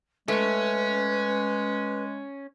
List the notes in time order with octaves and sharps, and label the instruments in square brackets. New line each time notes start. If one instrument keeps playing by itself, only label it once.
[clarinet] G#3 [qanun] A3 C#6 [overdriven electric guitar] C#4 [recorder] B4